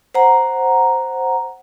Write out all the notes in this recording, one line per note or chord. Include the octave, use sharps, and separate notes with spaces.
C5 F#5 A#5